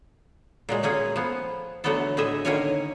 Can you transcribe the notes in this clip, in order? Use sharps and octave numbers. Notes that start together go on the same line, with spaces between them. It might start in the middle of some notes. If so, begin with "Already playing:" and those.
A#2 F#3 G#3
A3 A#3 C#4 G#4
F3 B3
D3 E3 F#3 A3 B3 A4
A2 D3 G#4 D#5 E5
D3 D#3 A#3 C#4 C#5 G#5